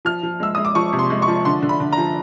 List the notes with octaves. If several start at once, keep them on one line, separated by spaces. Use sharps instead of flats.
F3 F6
F3
G#3 E6
G#3 D#6
D6
F3 C#6
C3
C6
G#3
C#6
F3
D3 C6
D3
B5
D3
A#5
F3